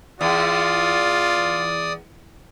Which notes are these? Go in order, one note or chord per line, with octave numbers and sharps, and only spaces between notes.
E2 F4 D5 D#6